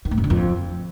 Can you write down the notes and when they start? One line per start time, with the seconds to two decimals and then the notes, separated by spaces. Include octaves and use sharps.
0.05 D#3
0.11 A2
0.18 F#2
0.24 D3
0.30 F2